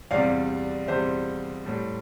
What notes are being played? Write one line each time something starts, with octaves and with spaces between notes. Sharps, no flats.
E2 C3 G3 D5 F5
E2 C3 G3 C5 E5
A2 G3